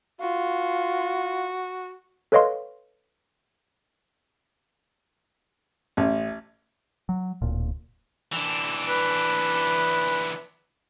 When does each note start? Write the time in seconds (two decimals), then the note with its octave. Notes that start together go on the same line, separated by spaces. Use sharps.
0.21 F4 F#4
2.32 A4 B4 C#5 D#5 F5 C6
5.97 A1
7.09 F#3
7.42 D1 A#2
8.33 E3 D4
8.89 B4